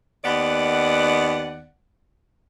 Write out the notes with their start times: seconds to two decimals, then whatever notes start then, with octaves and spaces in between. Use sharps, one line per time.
0.24 D#2 D#3 B3 D5 F#5